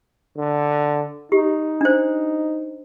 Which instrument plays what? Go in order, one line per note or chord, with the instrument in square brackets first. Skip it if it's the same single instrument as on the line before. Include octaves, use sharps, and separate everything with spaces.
[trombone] D3
[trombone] D#4 [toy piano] G4
[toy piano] D4 C5